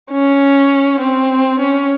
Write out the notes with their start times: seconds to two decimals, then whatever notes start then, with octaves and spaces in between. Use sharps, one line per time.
0.11 C#4
1.00 C4
1.60 C#4